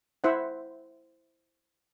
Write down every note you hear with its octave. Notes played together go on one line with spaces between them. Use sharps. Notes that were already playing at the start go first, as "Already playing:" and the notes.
E4 C5 E5 F#5